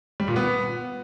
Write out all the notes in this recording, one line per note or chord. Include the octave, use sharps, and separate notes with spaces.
G3
A#2
B3